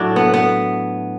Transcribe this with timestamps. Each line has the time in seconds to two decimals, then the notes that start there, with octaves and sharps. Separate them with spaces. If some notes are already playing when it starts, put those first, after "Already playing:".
Already playing: A2 F#3 A3 D4
0.16 B3
0.34 B3